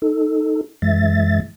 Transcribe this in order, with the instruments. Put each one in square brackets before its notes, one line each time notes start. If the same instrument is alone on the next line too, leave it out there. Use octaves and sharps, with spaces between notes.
[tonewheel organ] D#4 A4
F#2 E3 G#3 E5 A6